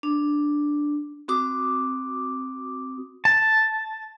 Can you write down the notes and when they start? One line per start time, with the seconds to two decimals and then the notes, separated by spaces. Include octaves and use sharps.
0.03 D4
1.28 C4 F#4 D6 D#6
3.25 A5